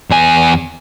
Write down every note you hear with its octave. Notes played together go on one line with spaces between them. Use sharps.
E2 G#5